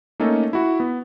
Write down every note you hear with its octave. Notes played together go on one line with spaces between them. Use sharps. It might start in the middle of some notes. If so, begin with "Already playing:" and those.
A3 A#3 C#4 D#4 A4
E4 F#4
B3